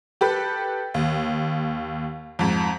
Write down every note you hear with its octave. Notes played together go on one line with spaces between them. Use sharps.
G4 A4 B4
D#2
F2 G#2